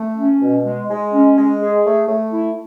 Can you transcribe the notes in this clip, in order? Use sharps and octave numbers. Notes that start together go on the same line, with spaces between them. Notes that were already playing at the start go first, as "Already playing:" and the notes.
Already playing: A3
C#4
B2
G#3
G#3
C#4
G#3
G#4
A3
A3
E4